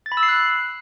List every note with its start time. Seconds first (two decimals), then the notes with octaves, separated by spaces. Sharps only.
0.06 A6
0.12 B5
0.17 E6
0.23 C7
0.28 F#6